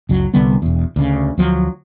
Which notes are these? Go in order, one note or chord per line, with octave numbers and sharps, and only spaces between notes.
F#1 C#2 F#3
C2 D3 G3 B3
E1 E2
D2 C#3
D2 F3 F#3